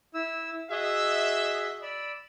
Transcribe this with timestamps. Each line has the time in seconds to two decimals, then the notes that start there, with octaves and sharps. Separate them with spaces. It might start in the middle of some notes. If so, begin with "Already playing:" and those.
0.14 E4 E6
0.70 F#4 G#4 D#5 E5
1.82 D5 B5 E6